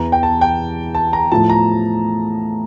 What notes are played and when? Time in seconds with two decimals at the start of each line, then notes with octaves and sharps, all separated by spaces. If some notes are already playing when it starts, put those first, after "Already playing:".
Already playing: E2 E3 A#5
0.12 G5
0.23 A5
0.41 G5
0.95 A5
1.13 A#5
1.32 A2 F3 A5
1.50 A#5